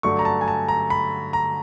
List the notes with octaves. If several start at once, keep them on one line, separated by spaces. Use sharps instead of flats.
G2 D3 F#3 A3 C#6
A#5
A5
G#5
A5
A#5
B5
A#5